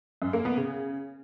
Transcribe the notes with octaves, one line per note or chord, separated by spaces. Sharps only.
F#2
A#3
B3
C#3